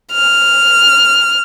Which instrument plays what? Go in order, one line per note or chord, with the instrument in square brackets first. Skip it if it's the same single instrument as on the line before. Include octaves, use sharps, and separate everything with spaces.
[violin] F6